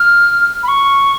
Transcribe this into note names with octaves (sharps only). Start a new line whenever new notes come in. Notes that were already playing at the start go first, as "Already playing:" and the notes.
Already playing: F6
B5
C#6